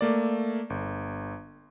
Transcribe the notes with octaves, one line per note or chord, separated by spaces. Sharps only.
A3 A#3 D5
G1